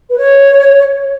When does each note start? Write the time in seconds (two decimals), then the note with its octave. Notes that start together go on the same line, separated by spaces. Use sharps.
0.10 B4
0.17 C#5